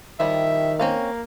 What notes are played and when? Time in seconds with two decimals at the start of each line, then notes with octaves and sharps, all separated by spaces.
0.20 D#3 F3 G3 E4 E5
0.80 A#3 C4 C#4 F5